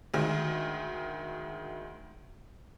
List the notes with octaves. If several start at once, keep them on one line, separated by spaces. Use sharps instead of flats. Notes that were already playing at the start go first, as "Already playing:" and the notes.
D2 D#3 G#3